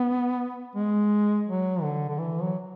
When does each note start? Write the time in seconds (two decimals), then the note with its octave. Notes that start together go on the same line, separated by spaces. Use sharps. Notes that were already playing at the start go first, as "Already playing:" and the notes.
Already playing: B3
0.75 G#3
1.47 F#3
1.82 D3
2.09 D3
2.18 E3
2.42 F#3